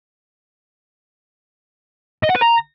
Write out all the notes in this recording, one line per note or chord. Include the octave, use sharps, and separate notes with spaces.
D#5
F#5
B4
A#5